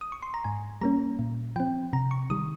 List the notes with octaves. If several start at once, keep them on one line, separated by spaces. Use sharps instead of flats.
D#6
C#6
C6
A#5
G#2 G#5
G3 A#3 C#4 A#5
A#2
F3 C4 G5
C3 A#5
C#6
D#3 G3 D#6